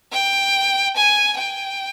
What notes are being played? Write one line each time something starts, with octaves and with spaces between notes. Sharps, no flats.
G5
G#5
G5